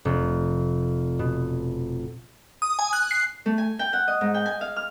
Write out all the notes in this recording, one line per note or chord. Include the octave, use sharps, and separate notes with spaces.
F1
B2
D#6
G#5
F#6
C7
A3
G#5
G5
F#5
D#5
G#2
G5
G#5
F5
F6